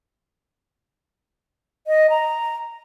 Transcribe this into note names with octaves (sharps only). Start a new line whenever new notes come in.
D#5
A#5